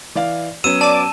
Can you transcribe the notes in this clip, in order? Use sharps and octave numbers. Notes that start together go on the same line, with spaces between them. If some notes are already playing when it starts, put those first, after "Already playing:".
E3 D5 F5
F#3 B3 C#4 E6 D#7 E7
D5 A5 D6